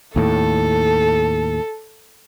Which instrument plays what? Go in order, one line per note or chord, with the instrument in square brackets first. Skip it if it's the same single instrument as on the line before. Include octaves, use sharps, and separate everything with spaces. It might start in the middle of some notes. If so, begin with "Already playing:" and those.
[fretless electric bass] D#2 A2 [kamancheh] A4